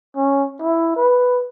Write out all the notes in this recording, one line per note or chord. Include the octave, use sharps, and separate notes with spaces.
C#4
E4
B4